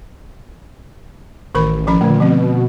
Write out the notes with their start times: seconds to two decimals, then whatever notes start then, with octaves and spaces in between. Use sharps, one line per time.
1.55 A1 D#3 A#4 B5
1.87 F3 C#4 B5
2.01 A#2 D3 A3
2.20 B2 F3 C4